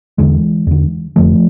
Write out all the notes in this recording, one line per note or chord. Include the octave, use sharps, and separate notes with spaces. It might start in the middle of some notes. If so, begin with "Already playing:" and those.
E2 D3 E3 G#3
E2 D3
F2 D3 F3 A3